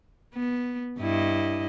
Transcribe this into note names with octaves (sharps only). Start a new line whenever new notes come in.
B3
G2 E4 D#5